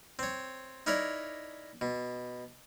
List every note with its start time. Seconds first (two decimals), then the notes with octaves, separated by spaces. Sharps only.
0.19 C4 C#5
0.87 D#4 E4 A#4 C#5 D5
1.81 B2